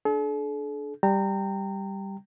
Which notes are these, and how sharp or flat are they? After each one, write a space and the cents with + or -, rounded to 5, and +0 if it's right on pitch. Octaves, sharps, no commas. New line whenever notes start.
D4 +0 A4 -45
G3 +0 G5 +0 A#5 -30